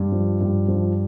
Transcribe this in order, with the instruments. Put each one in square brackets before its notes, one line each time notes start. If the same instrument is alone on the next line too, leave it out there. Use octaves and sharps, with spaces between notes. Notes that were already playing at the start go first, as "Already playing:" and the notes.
Already playing: [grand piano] G2
F3
G2
F3